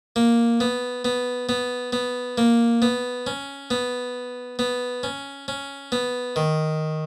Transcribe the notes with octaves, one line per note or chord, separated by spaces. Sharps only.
A#3
B3
B3
B3
B3
A#3
B3
C#4
B3
B3
C#4
C#4
B3
D#3